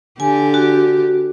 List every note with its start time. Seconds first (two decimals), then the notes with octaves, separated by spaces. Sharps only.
0.20 D3 G4 G#5
0.54 F#4